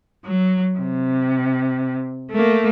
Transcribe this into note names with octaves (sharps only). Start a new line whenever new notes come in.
F#3
C3
A3 A#3